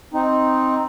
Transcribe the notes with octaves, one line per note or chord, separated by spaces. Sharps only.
C4 D#4